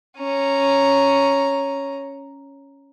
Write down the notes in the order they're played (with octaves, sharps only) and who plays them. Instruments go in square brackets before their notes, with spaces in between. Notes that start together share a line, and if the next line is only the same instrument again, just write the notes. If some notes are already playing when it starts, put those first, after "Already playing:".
[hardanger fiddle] C#4 A#5